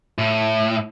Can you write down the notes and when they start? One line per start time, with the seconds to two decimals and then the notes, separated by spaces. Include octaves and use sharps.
0.18 A2